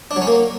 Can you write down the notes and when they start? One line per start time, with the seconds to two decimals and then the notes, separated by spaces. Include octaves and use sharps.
0.11 D4
0.16 F#3
0.22 C#4
0.27 A#3